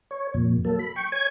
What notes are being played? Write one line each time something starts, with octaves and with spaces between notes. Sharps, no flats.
C#5
F2 A#2
F#3 A#3 A4
B5
G5 C#6
C#5 G#5 G#6